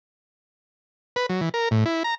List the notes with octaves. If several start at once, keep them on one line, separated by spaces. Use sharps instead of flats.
B4
F#3
E3
A#4
A2
E4
A#5